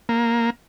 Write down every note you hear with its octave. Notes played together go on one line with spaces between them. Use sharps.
A#3